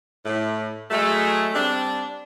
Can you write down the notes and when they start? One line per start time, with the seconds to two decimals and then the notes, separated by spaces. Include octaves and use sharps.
0.25 A2
0.91 F#3 G#3 A3
1.54 G3 C4 D4